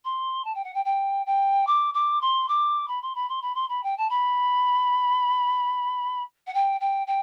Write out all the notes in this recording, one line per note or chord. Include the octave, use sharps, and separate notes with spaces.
C6
A5
G5
F#5
G5
G5
G5
D6
D6
C6
D6
B5
C6
B5
C6
B5
C6
B5
G5
A5
B5
F#5
G5
G5
G5